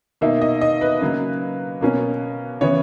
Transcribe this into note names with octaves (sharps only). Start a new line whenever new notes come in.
B2 A#3 D#4 E5
D#5
D#5
B4
C#3 F#3 A#3
B2 A#3 C#4
C#3 E3 B3 C#5